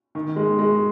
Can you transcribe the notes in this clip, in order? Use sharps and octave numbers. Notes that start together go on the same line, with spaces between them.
D#3
G#3
G#3